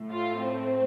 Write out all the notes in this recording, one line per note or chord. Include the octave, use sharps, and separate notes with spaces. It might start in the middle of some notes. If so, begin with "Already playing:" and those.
Already playing: A2 A3
F4
C4